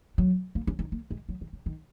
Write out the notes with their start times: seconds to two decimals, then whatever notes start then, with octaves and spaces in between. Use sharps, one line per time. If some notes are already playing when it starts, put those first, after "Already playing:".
0.18 F#3
0.55 A#3
0.67 C#4
0.79 D#4
0.92 A#3
1.11 G#3
1.29 F#3
1.41 D#3
1.53 C#3
1.66 D#3